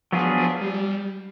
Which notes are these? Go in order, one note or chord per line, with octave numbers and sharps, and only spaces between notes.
F3 F#3 B3 D4 F4 G#4
F3
G3